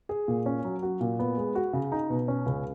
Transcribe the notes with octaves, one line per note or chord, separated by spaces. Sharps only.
G#4
A#2
C#4
F#3
F#4
A#2
B3
G#3
F#4
C#3
D#4
B2
C#4
C#2